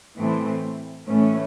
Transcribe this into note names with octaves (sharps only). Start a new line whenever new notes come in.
A2 E3 A3 C4
A2 E3 A3 C#4